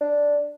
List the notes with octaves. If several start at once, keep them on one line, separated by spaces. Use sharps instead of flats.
D4